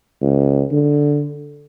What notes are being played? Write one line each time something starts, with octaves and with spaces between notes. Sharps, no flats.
C#2
D3